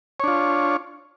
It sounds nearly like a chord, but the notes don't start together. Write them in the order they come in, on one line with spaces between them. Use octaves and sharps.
C#5 D4 F4